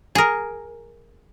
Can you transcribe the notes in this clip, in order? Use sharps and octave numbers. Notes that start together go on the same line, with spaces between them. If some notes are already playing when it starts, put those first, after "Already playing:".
G#4 A#4